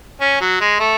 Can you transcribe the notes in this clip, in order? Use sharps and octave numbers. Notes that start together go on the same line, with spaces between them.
C#4
F#3
G#3
A3